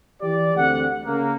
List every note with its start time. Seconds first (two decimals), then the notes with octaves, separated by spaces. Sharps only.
0.22 E3 G4 D5
0.55 D2 D3 C4 F#5
1.04 C#3 A#3